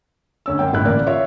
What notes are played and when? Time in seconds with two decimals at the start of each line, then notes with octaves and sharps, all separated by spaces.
0.46 D2 C#4 E6
0.59 F#2 G5
0.72 G1 F#2 A2 E4 E5 F#6
0.85 A1 A#3 A#4 D5
1.06 F4 C#5 E5